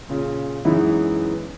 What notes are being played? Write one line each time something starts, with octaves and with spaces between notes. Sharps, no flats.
A#2 C#3
F#2 E3 G#3 B3 D#4 E4